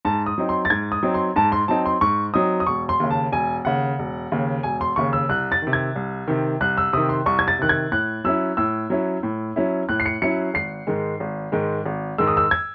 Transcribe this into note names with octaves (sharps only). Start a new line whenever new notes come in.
G#2 A5
D#6
F#3 C4 D#4
C6
A6
G#2 G#6
D#6
F#3 C4 D#4
C6
G#2 A5
C6
F#3 C4 D#4 A5
C6
G#2 C#6
F#3 C4 D#4 D#6
D#6
E1 C#6
C6
D#2 C#3
A5
E1 G#5
D#2 C#3 F#5
E1
D#2 C#3
E1 G#5
C6
D#2 C#3 C#6
E6
C2 F#6
A6
C3 D#3
G#6
C2
C3 D#3
C2 F#6
E6
C3 D#3 D#6
C6
C2 C#6
G#6
A6
C3 D#3 F#6
G#6
A2 F#6
F#3 C#4 E4 E6
A2 E6
F#3 C#4 E4
A2
F#3 C#4 E4
A2 F#6
C7
C#7
F#3 C#4 E4 C#7
G#1 C7
G#2 D#3 G#3
G#1
G#2 D#3 G#3
G#1
G#2 D#3 G#3 E6
D#6
E6
G#6